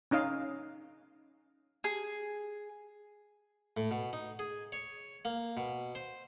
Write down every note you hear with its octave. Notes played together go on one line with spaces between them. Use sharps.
C#4 D#4 D#5 F5
G#4
A2
B2
D#4
G#4
C#5
A#3
B2
C5